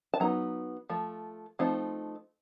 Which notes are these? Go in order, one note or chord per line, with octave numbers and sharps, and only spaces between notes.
A5
F#3 B3 D#4 A#5
F3 A3
F3 A3 C4 D#4